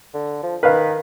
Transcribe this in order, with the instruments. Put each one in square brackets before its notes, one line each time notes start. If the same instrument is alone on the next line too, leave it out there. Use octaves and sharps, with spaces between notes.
[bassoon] D3
F3
[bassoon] D#3 [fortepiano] B4 F5